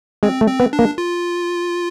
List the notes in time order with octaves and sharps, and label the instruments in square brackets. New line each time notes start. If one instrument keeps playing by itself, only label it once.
[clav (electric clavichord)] G#3 [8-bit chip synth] C4
[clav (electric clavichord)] A3
[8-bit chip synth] C4
[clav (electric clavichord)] B3
[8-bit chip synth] D4
[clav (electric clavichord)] A#3
[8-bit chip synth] F4